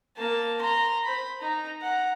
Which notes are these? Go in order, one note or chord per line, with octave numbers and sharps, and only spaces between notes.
A#3 A5
A#5 C6
C5 B5
D#4 A#5
F#5 A#5